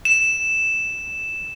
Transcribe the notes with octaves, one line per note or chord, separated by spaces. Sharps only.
E7